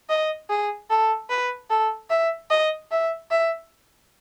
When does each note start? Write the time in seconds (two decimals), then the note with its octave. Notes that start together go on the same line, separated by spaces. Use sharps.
0.09 D#5
0.50 G#4
0.90 A4
1.30 B4
1.70 A4
2.10 E5
2.50 D#5
2.91 E5
3.31 E5